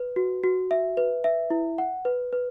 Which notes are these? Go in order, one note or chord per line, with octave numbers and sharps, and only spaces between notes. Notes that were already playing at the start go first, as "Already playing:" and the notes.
Already playing: B4
F#4
F#4
E5
B4
E5
E4
F#5
B4
B4